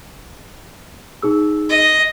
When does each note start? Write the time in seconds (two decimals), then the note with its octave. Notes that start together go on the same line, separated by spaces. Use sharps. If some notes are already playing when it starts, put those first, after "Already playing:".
1.22 D#4 G#4 E6
1.69 D#5